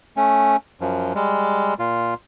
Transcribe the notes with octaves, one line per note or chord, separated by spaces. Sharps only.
A3 C#4
F#2 F3
G3 G#3
A#2 F4